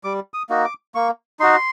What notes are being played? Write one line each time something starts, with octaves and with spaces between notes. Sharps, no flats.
G3 D6
D#6
A#3 D#4 F#4
D6
A#3 C#6
D#4 F#4 C6